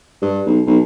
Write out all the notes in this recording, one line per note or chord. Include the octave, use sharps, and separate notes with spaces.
G2
B1
B1